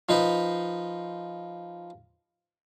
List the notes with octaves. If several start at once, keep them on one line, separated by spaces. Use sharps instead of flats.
F3 D#4 B4